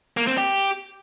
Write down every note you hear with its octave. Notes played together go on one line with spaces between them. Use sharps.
A#3
C4
G4